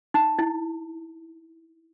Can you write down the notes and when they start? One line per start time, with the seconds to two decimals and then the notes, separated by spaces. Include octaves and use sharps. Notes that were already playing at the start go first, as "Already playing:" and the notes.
0.14 D#4
0.39 E4